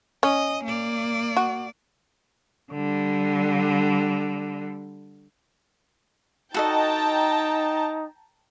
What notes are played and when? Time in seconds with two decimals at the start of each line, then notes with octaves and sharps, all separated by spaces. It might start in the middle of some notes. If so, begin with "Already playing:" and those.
0.23 C#4 D#5
0.64 A#3 D5
1.37 F#4
2.72 D3 G3
6.54 D#4 F#4 A4 D#5 G5 A5 A#5